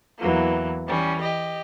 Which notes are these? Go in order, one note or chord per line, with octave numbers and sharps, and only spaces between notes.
E2 E3 F#3 A#3
E3 G3 C#4
G4 D#5